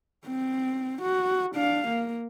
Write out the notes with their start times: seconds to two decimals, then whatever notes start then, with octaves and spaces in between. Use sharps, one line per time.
0.27 C4
1.02 F#4
1.55 D4 F5
1.88 A#3